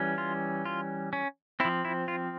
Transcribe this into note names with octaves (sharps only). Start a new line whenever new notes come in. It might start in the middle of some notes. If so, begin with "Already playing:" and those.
Already playing: E3 G3 C#4
F4
F4
C#4
F3 C4 E4
E4
F4